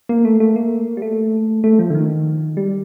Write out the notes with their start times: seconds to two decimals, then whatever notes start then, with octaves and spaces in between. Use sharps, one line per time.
0.09 A#3
0.25 A3
0.40 A3
0.56 A#3
0.97 G3
1.02 A3
1.64 A3
1.79 F3
1.90 D3
1.95 D#3
2.57 G3